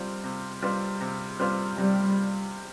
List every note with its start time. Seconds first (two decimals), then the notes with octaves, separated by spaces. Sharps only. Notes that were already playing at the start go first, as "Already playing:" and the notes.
Already playing: C3 G3 C4 F4 C5
0.24 C3
0.62 G3 C4 F4 C5
1.01 C3
1.40 G3 C4 F4 C5
1.77 C3 G3